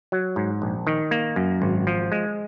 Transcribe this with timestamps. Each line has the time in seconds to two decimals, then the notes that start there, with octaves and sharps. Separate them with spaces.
0.12 F#3
0.36 G#2
0.62 A#1
0.87 D#3
1.11 A#3
1.36 F#2
1.62 G#1
1.87 F3
2.12 G#3